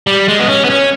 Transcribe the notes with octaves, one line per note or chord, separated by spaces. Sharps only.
G3
G#3
B3
C#4
B3
C#4